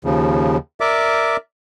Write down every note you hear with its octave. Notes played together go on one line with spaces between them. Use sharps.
D#2 C#3 F3
A#4 D5 E5 D6